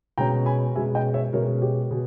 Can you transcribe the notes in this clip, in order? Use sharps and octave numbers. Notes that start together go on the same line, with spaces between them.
B2 G#3 C#4 G5 A#5
G#5 B5
B2 G#3 C#4 E5 G#5
D#5 G5
C#5 E5
B2 G#3 C#4 A#4 C#5
G4
B2 G#4